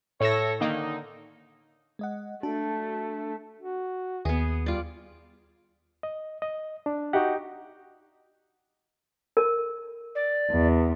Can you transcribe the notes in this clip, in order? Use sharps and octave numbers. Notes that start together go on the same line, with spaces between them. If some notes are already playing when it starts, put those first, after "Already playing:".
A2 A4 C#5 E6 A#6
D3 D#3 A#3 D#4
G#3 D#5 F#5
A3 D4 F#4 A5
F#4
D#2 B3 G#4
G3 F4 D5
D#5
D#5
D4
D#4 F#4 G4 F#5
A#4
D5
E2